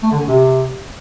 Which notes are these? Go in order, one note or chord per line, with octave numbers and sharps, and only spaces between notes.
A3
D3
C#4
C3